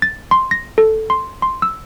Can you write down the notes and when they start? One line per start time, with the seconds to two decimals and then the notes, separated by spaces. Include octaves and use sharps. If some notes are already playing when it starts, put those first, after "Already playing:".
0.02 A6
0.31 C6
0.51 A#6
0.78 A4
1.10 C6
1.42 C6
1.62 E6